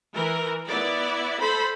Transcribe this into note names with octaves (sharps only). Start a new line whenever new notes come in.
E3 A#4
B3 E4 D5
A4 C5 B5